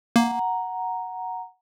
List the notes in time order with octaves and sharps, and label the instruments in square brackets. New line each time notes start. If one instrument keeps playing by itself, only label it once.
[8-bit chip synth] A#3 [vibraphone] F#5 A#5